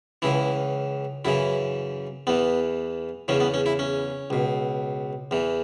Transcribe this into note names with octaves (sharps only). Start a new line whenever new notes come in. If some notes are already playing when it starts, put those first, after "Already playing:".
C#2 C#3 E3 E4
F#2 C#3 E3 E4
E2 E3 B3
E2 C#3 E3 C#4
B3
C#4
E4
C#4
C#2 B2
E2 E3